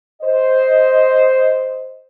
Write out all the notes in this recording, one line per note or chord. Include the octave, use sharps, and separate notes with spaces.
C5 D#5